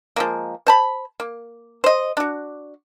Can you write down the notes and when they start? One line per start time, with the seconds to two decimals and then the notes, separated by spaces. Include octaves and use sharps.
0.16 F3 G#3 A#3
0.67 C5 A5 B5
1.20 A#3
1.84 C5 D#5
2.17 D4 F#4